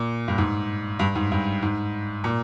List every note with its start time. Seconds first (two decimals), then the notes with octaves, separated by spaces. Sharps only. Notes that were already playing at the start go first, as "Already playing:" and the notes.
Already playing: A#2
0.28 G2
0.38 G#2
0.99 G2
1.15 G#2
1.32 G2
1.63 G#2
2.24 A#2